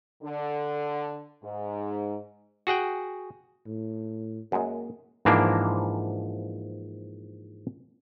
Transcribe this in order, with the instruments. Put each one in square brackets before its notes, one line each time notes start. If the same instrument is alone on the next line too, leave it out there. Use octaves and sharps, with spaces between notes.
[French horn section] D3
G#2
[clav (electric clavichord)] F#4 G#4 F#5 G5
[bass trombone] A2
[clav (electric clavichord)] F#2 G#3 [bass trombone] A#3
[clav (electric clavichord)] G#2 E3 F3 A#3 D4